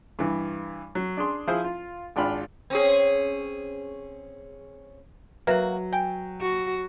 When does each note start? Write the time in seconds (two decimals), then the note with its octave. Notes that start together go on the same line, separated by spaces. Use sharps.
0.19 G2 E3
0.95 F#3
1.17 D4 G#4 C6
1.47 F3 E4 G#4 C5
1.64 F4
2.16 G#1 D4 F4 G5 B5 F6
2.70 C4 C#4 G#4
5.47 F#3 A#3 F#4 B4 E5
5.93 G5 G#5
6.41 F#4